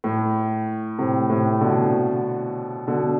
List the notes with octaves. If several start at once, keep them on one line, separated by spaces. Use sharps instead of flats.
A2
A2 C3
A2 C3
B2 D3
B2 D3